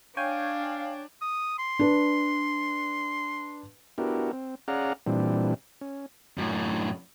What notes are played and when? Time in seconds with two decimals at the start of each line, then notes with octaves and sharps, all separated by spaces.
0.17 D4 C#5 F5 G5 G#5
1.21 D#6
1.58 C6
1.79 D4 B4
3.98 B3 D4 E4 F#4 G4 A#4
4.33 C4
4.68 C#4 G#4 D5 F5 F#5 A#5
5.07 A#2 E3 G3 C4 D4
5.81 C#4
6.38 F#2 A2